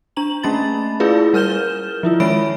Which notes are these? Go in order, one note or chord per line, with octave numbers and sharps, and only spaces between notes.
D4 A#5 F#7
A3 A#3 C#4 B5 A6
E4 F4 G#4 B4 D5 F5
G3 A#4 F6 G6 E7 G7
F3 E4 F4
D#3 G#3 C#5 E5 B5 D7